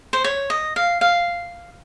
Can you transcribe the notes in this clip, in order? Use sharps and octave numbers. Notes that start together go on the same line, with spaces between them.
C5
C#5
D#5
F5
F5